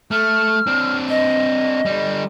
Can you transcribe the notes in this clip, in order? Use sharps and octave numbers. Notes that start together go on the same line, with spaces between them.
A3 F6
C4 D4
D#5
D3 G3